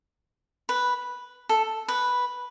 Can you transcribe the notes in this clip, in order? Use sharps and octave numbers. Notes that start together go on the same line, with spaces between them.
B4
A4
B4